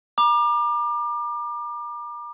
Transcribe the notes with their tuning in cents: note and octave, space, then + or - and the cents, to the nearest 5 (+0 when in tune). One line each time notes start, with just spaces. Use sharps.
A#5 +40 D6 +30